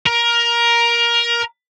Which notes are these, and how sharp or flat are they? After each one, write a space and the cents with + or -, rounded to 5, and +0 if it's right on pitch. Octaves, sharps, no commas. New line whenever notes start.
A#4 +15